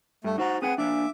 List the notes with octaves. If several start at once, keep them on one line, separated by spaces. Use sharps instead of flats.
G2 A3
D#4 F#4 C5 A#5
C4 G#4 B4 F#5 D#6
A#3 D4 E5 D6